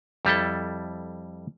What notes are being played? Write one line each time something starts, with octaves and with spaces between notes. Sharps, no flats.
F2 G3 E4 A4